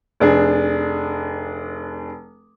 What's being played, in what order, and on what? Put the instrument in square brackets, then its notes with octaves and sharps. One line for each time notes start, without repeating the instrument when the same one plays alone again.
[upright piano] F1 D4 G#4